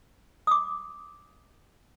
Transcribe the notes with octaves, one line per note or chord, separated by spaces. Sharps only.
D6 D#6